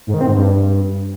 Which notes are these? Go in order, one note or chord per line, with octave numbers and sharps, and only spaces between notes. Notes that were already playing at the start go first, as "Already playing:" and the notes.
G#2
D#3
C4
G#2
G2